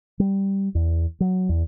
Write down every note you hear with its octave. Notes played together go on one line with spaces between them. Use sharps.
G3
E2
F#3
E2